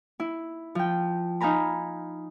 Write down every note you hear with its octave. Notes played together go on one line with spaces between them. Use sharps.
E4
F3 G5
D#4 F5 G#5 A#5 B5